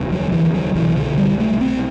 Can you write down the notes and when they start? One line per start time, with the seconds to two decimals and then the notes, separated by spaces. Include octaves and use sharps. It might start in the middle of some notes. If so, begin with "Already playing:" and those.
Already playing: E1 D2 C3
0.12 F#3
0.32 E3
0.54 F#3
0.75 C2 B2 E3
0.97 D3
1.18 G3
1.40 A3
1.61 C4